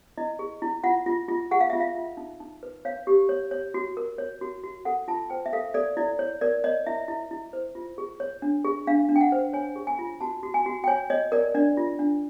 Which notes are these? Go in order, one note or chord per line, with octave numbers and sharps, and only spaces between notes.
E4 D#5
G#4
E4
F4 F#5
F4
F4
G#4 F#5
F5
F4 E5
F5
F4
D#4
D#4
B4
C#5 F5
G4
C#5
C#5
F#4
A#4
C#5
F#4
F#4
A4 F#5
F4 A5
C5 G5
E5
A4 F5
A4 D5
E4 D5
C#5
A#4 D5
C#5 D#5
E4 E5
E4
E4
C5
F4
G#4
C#5
D4
G#4
D4 F5
D4
G5
F#5
C5
C#5 G#5
G#4
G#5
F4
F#4 A5
F#4
G#5
F#4
G5
C#5 G#5
C#5 D#5
A#4 D5
D4 D5
F4
D4